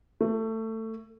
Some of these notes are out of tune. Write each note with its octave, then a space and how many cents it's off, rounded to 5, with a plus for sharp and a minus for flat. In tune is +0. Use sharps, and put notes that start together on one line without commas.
A3 +20